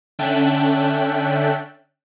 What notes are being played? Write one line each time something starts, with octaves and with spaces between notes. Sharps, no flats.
D3 C#4 E5 G5 A5 F#6